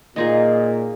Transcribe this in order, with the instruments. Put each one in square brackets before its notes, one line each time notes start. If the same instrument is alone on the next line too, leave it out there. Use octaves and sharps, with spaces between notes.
[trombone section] A#2 [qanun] D#4 F4 G#4